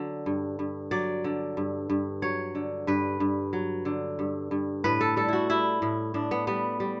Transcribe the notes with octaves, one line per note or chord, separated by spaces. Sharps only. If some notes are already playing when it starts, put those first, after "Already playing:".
Already playing: D3 F#3
G2
G2
F#3 D5
D3
G2
G2
F#3 C#5
D3
G2 B4
G2
F#3
D3
G2
G2
A2 B4
A4
G3 A4
E4 F#4
G3 E4
A2
A2 D4
B3
G3 B3
G3